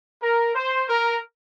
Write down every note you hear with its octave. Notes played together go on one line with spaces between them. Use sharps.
A#4
C5
A#4